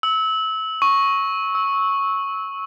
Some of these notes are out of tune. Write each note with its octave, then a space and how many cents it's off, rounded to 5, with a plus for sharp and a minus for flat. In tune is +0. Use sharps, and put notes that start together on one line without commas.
E6 -25
C#6 -5
E6 -20